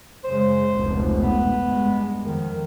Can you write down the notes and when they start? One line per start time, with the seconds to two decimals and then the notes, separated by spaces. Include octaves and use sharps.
0.24 F#2 C#3 G#3 C5
0.72 F1 C#2 B2
1.21 B3
1.65 G2 G#3
2.22 F2 D#3